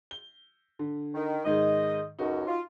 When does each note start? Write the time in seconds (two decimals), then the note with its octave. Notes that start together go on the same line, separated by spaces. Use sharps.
0.11 G7
0.79 D3
1.14 D#3
1.45 G#2 D#3 G#3 D#5
2.19 C#2 F#2 D#4 F#4
2.47 F4